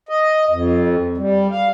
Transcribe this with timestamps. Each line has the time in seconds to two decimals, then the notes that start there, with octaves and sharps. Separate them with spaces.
0.09 D#5
0.51 F2
1.17 G3
1.51 F5